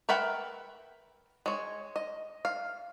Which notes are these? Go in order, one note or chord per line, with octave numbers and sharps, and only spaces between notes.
A#4 B4 E5 F#5 G5
G#3 C#5
D#5
F5